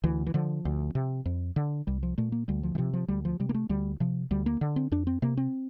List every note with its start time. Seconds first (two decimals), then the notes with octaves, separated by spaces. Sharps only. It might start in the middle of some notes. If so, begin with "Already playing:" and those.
0.04 D2 E3
0.27 E3
0.34 D3 F3
0.65 D2
0.95 C3
1.25 F2
1.56 D3
1.87 C2 G3
2.03 F3
2.18 A#2 A3
2.32 A#3
2.48 D2 G3
2.63 F3
2.75 E3
2.78 C3 F3
2.93 F3
3.08 D2 G3
3.25 F3
3.40 C3 G3
3.49 A#3
3.54 A3
3.69 D2 G3
4.00 C3 F3
4.31 D2 G3
4.46 A#3
4.61 D3
4.76 C4
4.92 F2 D4
5.07 C4
5.22 C3 A#3
5.37 C4